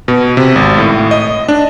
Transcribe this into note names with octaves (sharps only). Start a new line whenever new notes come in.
B2
C3
G#1
A2
D#5
D4